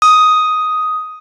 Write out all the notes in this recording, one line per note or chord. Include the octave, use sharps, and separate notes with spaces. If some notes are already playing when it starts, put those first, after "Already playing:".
D#6